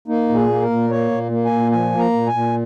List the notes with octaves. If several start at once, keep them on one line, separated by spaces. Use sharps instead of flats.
A#3 D#4
A#2
G#4
A#3
A#4
A#2
A#3 C#5
A#2
A#3
G#5
A#2
F3 G#5
A#3
A#5
A#2
G#5
A#2